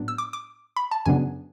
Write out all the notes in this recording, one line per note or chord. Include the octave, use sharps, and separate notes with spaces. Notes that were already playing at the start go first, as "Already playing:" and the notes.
Already playing: A2 F#3 B3 D4
E6
D6
D6
B5
A5
F#2 C#3 F#3 B3 D4 G#5